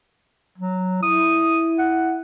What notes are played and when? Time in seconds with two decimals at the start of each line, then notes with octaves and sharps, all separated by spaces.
0.58 F#3
1.02 E4 D#6
1.78 F#5